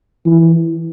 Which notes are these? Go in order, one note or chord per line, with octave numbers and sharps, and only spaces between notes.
E3